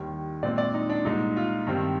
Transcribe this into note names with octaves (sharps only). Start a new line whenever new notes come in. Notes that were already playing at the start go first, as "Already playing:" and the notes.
Already playing: D#2 D#3 G3
A#2 G#3 C4 D5
D5
D#4
D4
C2 A#2 G#3 D#4
F4
G2 D#3 G3 C4